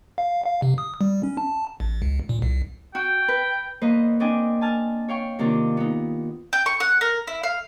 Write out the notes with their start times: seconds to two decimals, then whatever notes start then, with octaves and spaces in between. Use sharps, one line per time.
0.18 F5
0.46 F5
0.62 C3
0.78 D#6
1.01 G3
1.23 C#4
1.37 A5
1.80 A1
2.02 C#2
2.29 A#2
2.42 C2
2.95 F#4 G5
3.28 B4
3.81 E2 A#3 B4 C5 D#5
4.20 C4 D4 D#5 G5 G#5
4.61 G#5 A5 F6
5.08 C#5 F5 G5 C#6
5.39 C3 D#3 A#3 D4 F4
5.77 B3 D#4
6.53 G5
6.66 C#6
6.80 F#5
7.01 A#4
7.27 E4
7.43 F5